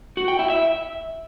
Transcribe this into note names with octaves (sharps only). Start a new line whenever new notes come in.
F#4
G5
E4
E5